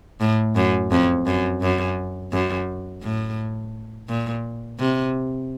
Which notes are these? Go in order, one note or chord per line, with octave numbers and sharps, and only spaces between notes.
A2
F#2
F2
F#2
F#2
F#2
A2
A#2
C3